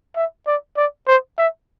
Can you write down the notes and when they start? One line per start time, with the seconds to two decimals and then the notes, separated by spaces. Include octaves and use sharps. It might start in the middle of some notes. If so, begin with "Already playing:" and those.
0.16 E5
0.47 D5
0.77 D5
1.07 C5
1.38 E5